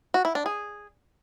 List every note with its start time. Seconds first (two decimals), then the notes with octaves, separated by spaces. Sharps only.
0.14 F#4
0.25 E4
0.35 D4
0.46 G#4